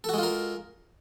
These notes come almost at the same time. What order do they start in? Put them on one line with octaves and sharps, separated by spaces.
A4 F#4 G#3 F4 A#4